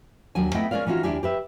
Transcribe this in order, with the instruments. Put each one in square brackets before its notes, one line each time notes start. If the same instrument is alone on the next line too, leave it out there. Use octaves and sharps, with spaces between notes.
[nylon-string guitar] D#2 F#3 D4 G#5
A3 B3 E4 G#4 D#5 G5
G#3 C#4 A#4 D5 F5
E3 C#4 D#4 F4 F#4
D#2 D4 E4 G4 G#4 G#5
G4 B4 E5